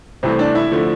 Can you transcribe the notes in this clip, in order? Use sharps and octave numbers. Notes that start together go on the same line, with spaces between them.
C2 C3 E3 A3 C4
D4
E4
D3 F3 A3